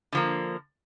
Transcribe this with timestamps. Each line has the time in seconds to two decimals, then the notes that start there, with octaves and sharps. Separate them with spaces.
0.12 D3 F3 A#3